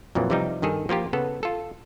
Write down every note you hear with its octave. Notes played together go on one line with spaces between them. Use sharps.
F2 A#2 E3 F#3
C3 E3 F3 G3 D#4
G2 D#3 G#4 A4
F3 A#3 F4 G4
C#3 B3 A4
F4 A4